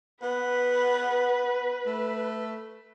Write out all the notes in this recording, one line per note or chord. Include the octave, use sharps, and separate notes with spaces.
B3 B4
A3